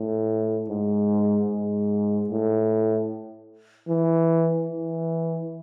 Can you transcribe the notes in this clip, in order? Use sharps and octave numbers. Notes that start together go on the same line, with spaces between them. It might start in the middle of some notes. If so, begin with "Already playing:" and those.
Already playing: A2
G#2
G#2
A2
E3
E3